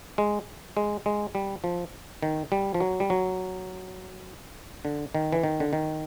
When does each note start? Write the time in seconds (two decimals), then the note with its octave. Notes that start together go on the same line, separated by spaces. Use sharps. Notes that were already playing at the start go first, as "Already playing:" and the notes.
0.18 G#3
0.77 G#3
1.06 G#3
1.35 G3
1.64 F3
2.23 D#3
2.52 G3
2.74 F3
2.80 F#3
3.00 G3
3.10 F#3
4.85 D3
5.15 D#3
5.33 E3
5.44 D#3
5.60 D3
5.73 D#3